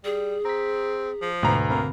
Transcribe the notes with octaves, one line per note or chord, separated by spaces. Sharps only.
G3 G#4
C4 A#5 B6
F3
D2 G#2 B2 B4 A#5
D3 A#3 C4 B5